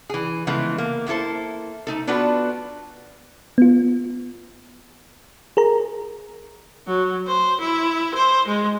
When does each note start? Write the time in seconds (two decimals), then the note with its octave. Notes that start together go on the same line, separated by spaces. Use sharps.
0.09 E3 G#4
0.47 C#3 E3 F3 G#3 A3 B3
0.78 A#3
1.07 A#3 B3 E4 A4 C5
1.87 A3 D#4 A4
2.07 B3 D4 F4 F#4 A4 B4
3.58 B3 F4
5.57 G#4 A#4 A#5
6.87 F#3
7.27 C5
7.60 E4
8.14 C5
8.47 G#3